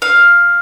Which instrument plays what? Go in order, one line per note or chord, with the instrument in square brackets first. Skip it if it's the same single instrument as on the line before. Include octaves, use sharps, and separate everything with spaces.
[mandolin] F5